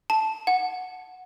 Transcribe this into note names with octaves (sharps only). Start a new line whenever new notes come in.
A5
F#5